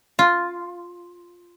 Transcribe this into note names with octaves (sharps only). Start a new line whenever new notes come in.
F4